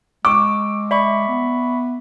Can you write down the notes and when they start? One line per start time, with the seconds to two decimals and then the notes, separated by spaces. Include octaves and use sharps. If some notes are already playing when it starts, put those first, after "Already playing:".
0.25 G#3 C#6 D6 E6
0.91 D5 E5 B5 C#6
1.28 B3